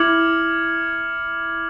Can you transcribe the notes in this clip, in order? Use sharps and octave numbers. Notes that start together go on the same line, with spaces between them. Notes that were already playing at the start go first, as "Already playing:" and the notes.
Already playing: E4 D6 F6 G#6 C#7 F#7